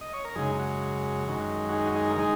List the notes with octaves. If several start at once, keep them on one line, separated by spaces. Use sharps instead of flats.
D#5
C#5
A#4
F#2 C#3 G#3 D#4 G#4
F#4
F#2 D#3 G#3
F#4
D#4 G#4
F#4
D#4 G#4
A#4
D#3 G#3 D#4 G#4